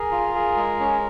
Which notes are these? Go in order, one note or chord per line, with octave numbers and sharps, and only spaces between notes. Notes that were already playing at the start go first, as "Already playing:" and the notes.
Already playing: G#4 A#4
F4
G#4
G#3
C#4